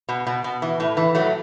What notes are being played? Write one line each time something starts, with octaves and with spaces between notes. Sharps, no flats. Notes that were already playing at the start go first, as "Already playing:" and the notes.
B2
B2
B2
E3
A2
E3
A2 F#3 A3